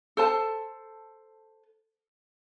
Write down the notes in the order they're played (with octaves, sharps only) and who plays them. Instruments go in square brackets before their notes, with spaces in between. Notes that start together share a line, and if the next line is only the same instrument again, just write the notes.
[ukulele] A4 C5 A5